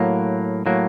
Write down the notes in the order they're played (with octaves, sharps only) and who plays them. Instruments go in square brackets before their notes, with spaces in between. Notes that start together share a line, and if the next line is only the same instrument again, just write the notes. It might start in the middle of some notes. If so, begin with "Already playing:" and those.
Already playing: [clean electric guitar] A2 F#3 A#3
A2 F#3 A#3